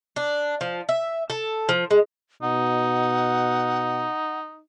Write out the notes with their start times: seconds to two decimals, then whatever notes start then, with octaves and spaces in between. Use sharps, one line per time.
0.16 D4
0.61 F3
0.89 E5
1.30 A4
1.69 F3
1.91 G#3
2.42 B2 D#4 F#5